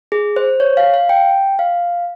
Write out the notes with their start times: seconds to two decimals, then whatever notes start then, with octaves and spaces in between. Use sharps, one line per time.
0.12 G#4
0.36 C5
0.60 C#5
0.77 F5
0.94 F5
1.09 G5
1.59 F5